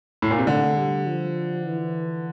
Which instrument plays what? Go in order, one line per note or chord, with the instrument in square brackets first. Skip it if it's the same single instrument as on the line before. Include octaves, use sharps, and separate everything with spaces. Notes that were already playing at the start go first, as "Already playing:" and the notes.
[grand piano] A2
A#2
C3
[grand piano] D3 [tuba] A3
[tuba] G3
F3
E3